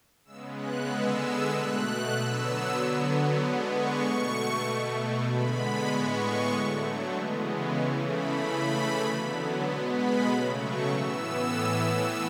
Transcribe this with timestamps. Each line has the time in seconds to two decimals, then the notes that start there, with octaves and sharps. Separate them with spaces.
0.24 C#3 G#3 B3 E6
0.56 F#6
0.87 D3 G#3 B3 E6
1.49 B2 A3 F#6
2.12 D3 F#3 B3 E6
2.75 D3 F#3 B3
3.38 D3 G#3 B3 D6
3.68 C#6
4.00 B2 A3
4.63 B2 A3
5.25 D3 G#3 B3 B5
5.88 A2 G#3 B3 C#6
6.51 D3 F#3 A3
7.13 C#3 E3 G#3 B3
7.76 C#3 E3 A3 C#6
8.06 B5
8.38 C#3 E3 A3
9.01 D3 F#3 B3
9.63 B2 G#3 B3 A5
9.94 B5
10.25 C#3 F#3 A3 B5
10.57 C#6
10.88 A2 E3 B3 E6